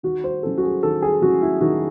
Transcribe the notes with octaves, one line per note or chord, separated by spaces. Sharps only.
D#3 F#4
C5
F#3 C#4 E4 A4
F#4
G#4
D#3 A4
G#4
F#3 C#4 E4 F#4
E4
D#3 F#4